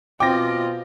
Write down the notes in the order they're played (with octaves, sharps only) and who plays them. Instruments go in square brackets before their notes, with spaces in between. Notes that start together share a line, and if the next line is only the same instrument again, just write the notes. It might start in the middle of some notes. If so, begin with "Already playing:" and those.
[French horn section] B2 C4 [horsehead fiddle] F4 D#5 [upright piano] G5 [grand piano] D6 A#6